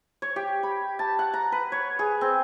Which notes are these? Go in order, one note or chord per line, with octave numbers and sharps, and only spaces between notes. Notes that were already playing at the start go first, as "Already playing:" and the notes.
C#5
G4
B5
A5
F#5
A#5
B4
C#5
G#4
C4